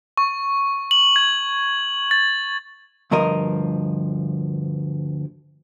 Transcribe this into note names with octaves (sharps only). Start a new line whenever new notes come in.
C#6
F#7
G#6
A6
D2 G2 F3 A#4 D#5